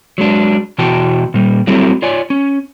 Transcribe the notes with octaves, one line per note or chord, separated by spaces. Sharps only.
F#3 G#3 D4
B2 E3 F#4 G5 A5
A#2 G3
F#3 G3 A3 C4 E4 G4
F4 C#5 D5 G#5
C#4